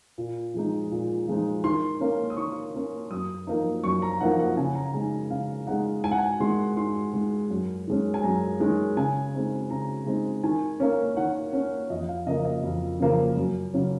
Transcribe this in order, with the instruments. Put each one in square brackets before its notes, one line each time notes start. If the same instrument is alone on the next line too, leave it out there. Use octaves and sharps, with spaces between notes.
[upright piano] A#2
F3 G#3 D#4
A#2
F3 G#3 D#4
D#3 C6
A#3 C#4
D#6
D#3 C#6
A#3 C#4
F#2 D#6
F3 A#3 D#4
F#2 C#6
A#5
F3 A#3 D#4 F#5
F#5
C#3 G#5
A#5
G#3 D#4 G#5
C#3 F5
G#3 D#4 F#5
G#2 G#5
F#5
G#5
D#3 G#3 C6
G#2 C6
D#3 G#3
F#2
D#3 G#3 C#4
G#5
F#2 A#5
D#3 G#3 C#4
C#3 G#5
G#3 C4 D#4
C#3 A#5
G#3 C4 D#4
D#3 G#5
A#3 C#4
D#3 F#5
A#3 C#4
F2 D#5
F5
C#3 F3 A#3 D#5
D#5
F2
C#3 F3 A#3
F#2
C#3 F#3 C#4